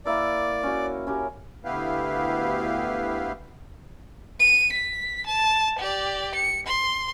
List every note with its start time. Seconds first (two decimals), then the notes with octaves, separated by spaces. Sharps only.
0.05 A#3 E4 A#4 D5
0.63 C#4 F#4
1.07 C#4 G4 A#4
1.65 D2 B3 E4 G4 B4 F5
4.40 D#7
4.72 B6
5.26 A5
5.79 G4 D5
6.35 C#7
6.66 C6